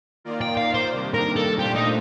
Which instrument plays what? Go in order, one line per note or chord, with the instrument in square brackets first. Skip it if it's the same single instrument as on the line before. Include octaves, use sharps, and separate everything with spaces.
[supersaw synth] D#3 A#3 F4 A#4 D5
[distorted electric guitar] G5
F5
C5
[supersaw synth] C3 D#3 G3 A#3 D4
[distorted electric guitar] A#4
A4
[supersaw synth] A#2 A3 D4 F4 C5 [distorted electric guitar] G4
[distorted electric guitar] D#4